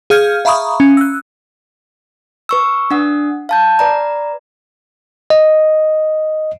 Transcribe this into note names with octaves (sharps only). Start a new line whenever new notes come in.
G#4 F5 F6 G6 G#6
E5 F5 A#5 B5 C#6 D#6
C#4
E6 F#6
B4 C#6 E6
D4 F#5 D#6
F5 A5 G6
B4 D5 A#5
D#5